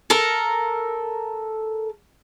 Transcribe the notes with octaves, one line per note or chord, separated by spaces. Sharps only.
A4 A#4